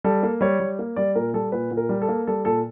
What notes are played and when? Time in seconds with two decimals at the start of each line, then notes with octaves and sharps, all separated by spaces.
0.04 G3 A4
0.23 A#3
0.41 G3 C#5
0.60 G3
0.79 A#3
0.96 G3 D5
1.16 A#2 A#4
1.34 G3 A4
1.52 A#2 B4
1.71 A#2
1.77 A#4
1.89 G3
2.02 A4
2.09 A#3
2.27 G3 A4
2.45 A#2 A4